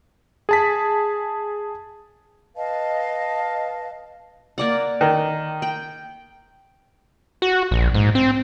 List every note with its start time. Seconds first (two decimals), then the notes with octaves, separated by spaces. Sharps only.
0.49 G#4 A5 B6
2.56 B4 D#5 F5 A5
4.58 A#3 D5 F#5
5.01 D#3
5.62 G5
7.42 F#4
7.71 A#1
7.94 G#2
8.15 C4